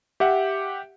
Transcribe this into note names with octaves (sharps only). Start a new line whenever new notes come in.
G4 E5 F#5